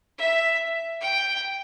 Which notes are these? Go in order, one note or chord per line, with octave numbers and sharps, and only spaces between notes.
E5
G5